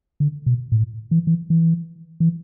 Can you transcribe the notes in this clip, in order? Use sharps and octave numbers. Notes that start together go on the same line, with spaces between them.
D3
B2
A2
E3
E3
E3
E3